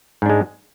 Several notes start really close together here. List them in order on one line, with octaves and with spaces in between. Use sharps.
G#2 D4 G#3